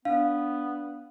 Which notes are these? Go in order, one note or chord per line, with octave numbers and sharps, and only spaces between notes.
B3 D4 F5